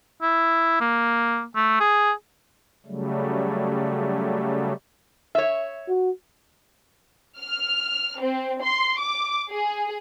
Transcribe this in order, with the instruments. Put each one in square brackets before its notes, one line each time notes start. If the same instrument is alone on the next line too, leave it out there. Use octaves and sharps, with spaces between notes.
[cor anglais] E4
A#3
A3
G#4
[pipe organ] C#3 F#3 G3 A3
[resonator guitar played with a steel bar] C#5 E5
[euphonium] F#4
[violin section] F6
C4
C6
D6
G#4